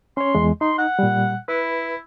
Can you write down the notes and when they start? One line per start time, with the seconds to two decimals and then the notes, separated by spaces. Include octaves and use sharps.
0.17 C#4 C#5 C6
0.35 E2 G#3
0.61 D#4 C6
0.78 F#5
0.99 A#2 G3
1.48 E4 B4